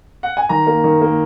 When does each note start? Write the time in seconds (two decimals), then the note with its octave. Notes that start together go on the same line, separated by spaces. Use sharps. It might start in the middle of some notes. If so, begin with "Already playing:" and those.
0.23 F#5
0.37 G#5
0.49 D#3 A#5
0.67 A#3
0.84 D#3
1.01 A#3